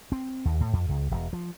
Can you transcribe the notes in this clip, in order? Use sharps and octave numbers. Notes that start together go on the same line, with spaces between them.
C4
D#2
A2
F2
C#2
E1
F3